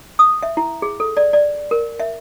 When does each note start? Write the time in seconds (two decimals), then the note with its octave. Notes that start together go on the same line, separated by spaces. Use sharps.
0.19 D#6
0.43 E5
0.57 E4
0.82 G#4
1.00 A4
1.17 D5
1.33 D5
1.71 A#4
2.00 E5